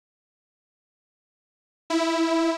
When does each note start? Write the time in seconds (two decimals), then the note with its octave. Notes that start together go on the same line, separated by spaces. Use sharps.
1.90 E4